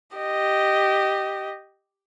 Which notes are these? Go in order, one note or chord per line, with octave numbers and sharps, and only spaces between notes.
G4 D#5